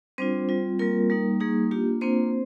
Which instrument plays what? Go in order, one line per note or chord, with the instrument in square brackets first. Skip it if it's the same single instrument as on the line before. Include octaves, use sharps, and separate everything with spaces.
[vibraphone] G3 C4 D4 F4 C5
G3 C4 F4
G3 A#3 C4 F4 A#4
G3 A#3 D#4
G3 A#3 D#4 G#4
A#3 D4 F4 G4
A#3 C4 D4 F4 C5